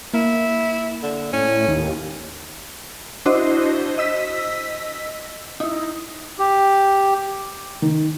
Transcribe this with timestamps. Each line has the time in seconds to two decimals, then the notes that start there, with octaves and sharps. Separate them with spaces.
0.14 A#3 E4
1.03 D3
1.33 A2 C#4
1.68 D#2
3.26 D4 E4 F#4 C5 D#5
3.98 D#5 E6 B6
5.60 D#4 E4
6.39 G4
7.82 D#3